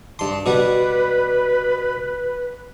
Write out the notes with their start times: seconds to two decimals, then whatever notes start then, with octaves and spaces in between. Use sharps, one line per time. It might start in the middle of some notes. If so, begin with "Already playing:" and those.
0.19 G2 A5 C6
0.46 B2 G3 B4 F#5